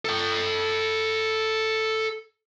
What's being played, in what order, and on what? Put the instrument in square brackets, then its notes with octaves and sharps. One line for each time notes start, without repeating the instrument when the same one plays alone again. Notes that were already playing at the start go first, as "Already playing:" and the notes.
[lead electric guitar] A4 G5